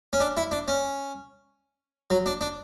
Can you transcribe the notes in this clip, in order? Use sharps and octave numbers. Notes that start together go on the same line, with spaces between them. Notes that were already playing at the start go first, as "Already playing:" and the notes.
C#4
D4
E4
D4
C#4
F#3
D4
D4